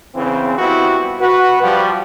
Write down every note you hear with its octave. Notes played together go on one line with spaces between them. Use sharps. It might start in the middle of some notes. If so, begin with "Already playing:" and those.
E2 C#3 E3 C4
F3 G3 B3 C4 E4 F#4
F#4 B4
F3 G3 F#4